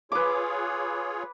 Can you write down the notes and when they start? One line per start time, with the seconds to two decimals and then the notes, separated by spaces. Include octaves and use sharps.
0.12 F4 G#4 B4 C#5 D6